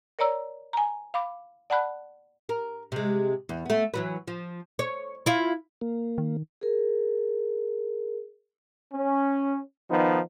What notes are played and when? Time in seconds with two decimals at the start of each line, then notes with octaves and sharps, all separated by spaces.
0.19 A#4 C#5 D5 A#5 E6
0.73 G#5 A#5
1.14 F5 B5 D6
1.70 D5 F#5 A5 B5 F#6
2.49 A#4
2.92 C3 G#3
3.49 E2
3.66 A3 B3
3.94 E3 F#3 B4
4.28 F3
4.79 C#5
5.26 E4 F4
5.81 A#3
6.18 D#3
6.61 G#4 A#4
8.93 C#4
9.90 D#3 F3 B3 D#4